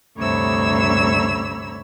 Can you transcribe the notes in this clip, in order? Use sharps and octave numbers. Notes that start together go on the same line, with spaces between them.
D2 G2 C3 C#5 B5 E6